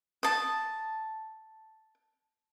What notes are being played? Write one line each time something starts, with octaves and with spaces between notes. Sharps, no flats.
A5 D#6